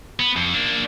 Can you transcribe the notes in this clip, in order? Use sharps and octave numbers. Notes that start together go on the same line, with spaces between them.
B3
F2
A#3 D4